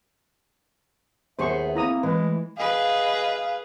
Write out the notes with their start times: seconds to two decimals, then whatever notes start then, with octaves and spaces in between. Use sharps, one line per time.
1.39 D#2 B3 G#4 C5 E5 C#6
1.75 A#3 C4 E4 A#5 D#6
2.03 E3 G#3 B4
2.21 A3
2.58 G#4 B4 D#5 F5